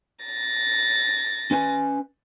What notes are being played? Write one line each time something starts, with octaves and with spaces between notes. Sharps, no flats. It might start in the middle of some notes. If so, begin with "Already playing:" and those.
A6 A#6
C#4 B4 G#5